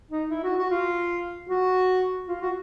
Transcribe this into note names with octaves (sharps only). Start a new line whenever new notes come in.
D#4
E4
F#4
F#4
F4
F#4
F4
F#4